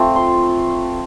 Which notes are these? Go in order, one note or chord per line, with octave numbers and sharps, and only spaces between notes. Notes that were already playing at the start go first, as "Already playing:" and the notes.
Already playing: A3 C4 F4
C6